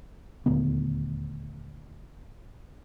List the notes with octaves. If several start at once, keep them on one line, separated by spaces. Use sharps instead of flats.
D#1 D2 B3